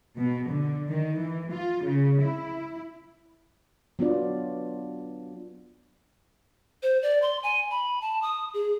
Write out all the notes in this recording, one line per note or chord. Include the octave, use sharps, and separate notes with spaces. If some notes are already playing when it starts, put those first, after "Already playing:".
B2
D3
D#3
E3
F4
C#3
E4
F#3 B3 D4 F4 D5
C5
D5
C6
G#5
B5
A5
D#6
G#4